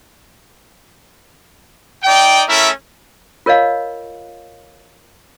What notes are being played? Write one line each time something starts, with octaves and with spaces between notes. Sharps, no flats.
D#4 D5 G5
A3 C#4 E4 A#4 E5
F4 A#4 C#5 D#5 F5